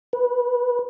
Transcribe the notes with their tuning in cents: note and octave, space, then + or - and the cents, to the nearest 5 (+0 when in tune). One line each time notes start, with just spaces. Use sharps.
B4 -10